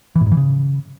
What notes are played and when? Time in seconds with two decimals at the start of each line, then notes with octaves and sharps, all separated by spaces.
0.16 E3
0.21 A2
0.26 G#2
0.32 E3
0.37 C#3